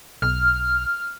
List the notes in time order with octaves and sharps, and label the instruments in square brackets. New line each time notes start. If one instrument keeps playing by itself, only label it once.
[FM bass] B1 [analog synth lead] F6